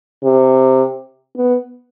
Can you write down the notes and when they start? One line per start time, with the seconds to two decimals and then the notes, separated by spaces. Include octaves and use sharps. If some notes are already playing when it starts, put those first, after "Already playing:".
0.24 C3
1.37 B3